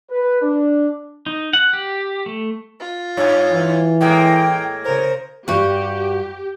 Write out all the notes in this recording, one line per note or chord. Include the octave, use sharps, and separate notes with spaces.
B4
D4
D#4
F#5
G4
A3
F4
G2 C#5
E3
A2 G#3 A#3 G5
C#3 A#4 C5
G2 F#4 G4